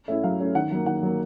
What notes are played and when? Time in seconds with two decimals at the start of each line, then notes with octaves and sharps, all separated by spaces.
0.08 A3 C#4 E4 E5
0.23 F#3 F5
0.39 A3 C#4 E4
0.55 D#3 F#5
0.71 F#3 A#3
0.86 D#3 F#5
1.03 F#3 A#3